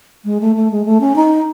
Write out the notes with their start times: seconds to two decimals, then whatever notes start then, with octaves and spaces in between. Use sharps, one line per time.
0.25 G#3
0.41 A3
0.56 A3
0.71 G#3
0.85 A3
1.01 C#4
1.16 D#4